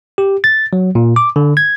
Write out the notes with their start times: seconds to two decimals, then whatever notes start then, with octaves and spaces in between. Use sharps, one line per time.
0.18 G4
0.44 A6
0.73 F#3
0.95 A#2
1.16 D6
1.36 D3
1.57 G#6